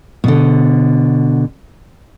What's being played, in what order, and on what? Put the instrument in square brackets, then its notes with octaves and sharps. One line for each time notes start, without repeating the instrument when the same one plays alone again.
[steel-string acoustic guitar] B2 D3